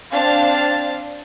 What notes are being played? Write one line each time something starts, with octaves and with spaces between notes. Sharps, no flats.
C4 D4 F5 A6